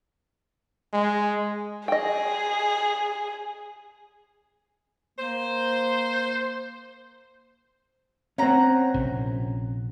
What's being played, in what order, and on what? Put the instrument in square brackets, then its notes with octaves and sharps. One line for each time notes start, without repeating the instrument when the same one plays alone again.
[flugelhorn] G#3
[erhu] G#4 [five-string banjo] D#5 G5
[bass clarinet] A#3 [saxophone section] C5
[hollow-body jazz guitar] C4 C#4 [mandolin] F#5 A#5
[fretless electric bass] A#1 C3